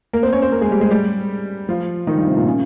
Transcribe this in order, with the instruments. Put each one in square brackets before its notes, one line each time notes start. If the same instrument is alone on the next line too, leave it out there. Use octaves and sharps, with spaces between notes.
[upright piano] A#3 A#4
C4 C5
C#4 C#5
C4 C5
A#3 A#4
G#3 G#4
G3 G4
G#3 G#4
G3 G4
F3 F4
D#3 D#4
G2 G3
C3 C4
A#2 A#3
C#3 C#4